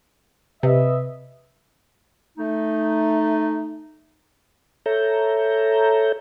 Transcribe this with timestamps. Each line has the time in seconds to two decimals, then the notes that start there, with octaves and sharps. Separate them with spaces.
0.63 C3 B4 D#5 E5
2.38 A3 D#4
4.86 A4 C#5 E5 A#5 G6